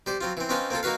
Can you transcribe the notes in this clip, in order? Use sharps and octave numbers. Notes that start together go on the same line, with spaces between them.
G3 C5 D5
F#3 C4 F4
E3 C4
C4 C#4 D#4 F4 B4 C5
A#3 C4 F4 A4
A#3 D#4 F#4 B4 F5